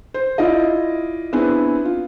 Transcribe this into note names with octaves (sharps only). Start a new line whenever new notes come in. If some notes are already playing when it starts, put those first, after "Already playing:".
C5
E4 F4 D5 D#5
B3 C4 D4 E4 G#4 B4
F4